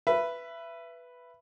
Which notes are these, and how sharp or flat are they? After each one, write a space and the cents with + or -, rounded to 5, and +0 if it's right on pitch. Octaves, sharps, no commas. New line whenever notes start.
B4 +0 E5 +25